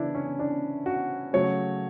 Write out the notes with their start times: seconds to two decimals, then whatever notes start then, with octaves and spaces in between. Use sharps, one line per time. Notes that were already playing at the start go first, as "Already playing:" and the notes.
Already playing: C#3 E3 D4 E4
0.15 C#4
0.39 D4
0.86 F#4
1.33 C#3 F#3 A3 C#5